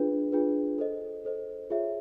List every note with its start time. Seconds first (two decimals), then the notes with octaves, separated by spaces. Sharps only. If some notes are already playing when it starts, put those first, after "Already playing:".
Already playing: D4 F4 G#4 B4
0.32 D4 F4 G#4 B4
0.78 A4 C5 D#5
1.25 A4 C5 D#5
1.70 F4 G#4 C#5 E5